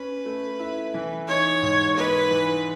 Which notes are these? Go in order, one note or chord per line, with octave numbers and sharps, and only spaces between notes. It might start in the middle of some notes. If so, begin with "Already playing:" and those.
Already playing: C#4 B4
A3
E4
E3
D#4 C#5
G#2
D#4 B4
E3